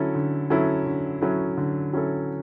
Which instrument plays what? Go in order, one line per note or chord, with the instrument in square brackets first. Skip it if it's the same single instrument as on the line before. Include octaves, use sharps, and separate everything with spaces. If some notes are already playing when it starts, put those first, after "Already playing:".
Already playing: [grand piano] D3 F#3 C#4 E4 A4
D3
F#3 C#4 E4 A4
D3
F#3 C#4 E4 A4
D3
F#3 C#4 E4 A4